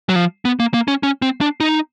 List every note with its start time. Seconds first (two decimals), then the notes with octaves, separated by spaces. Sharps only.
0.09 F#3
0.16 F3
0.45 B3
0.60 A#3
0.74 A#3
0.88 C#4
1.03 C#4
1.22 C4
1.41 D4
1.60 D#4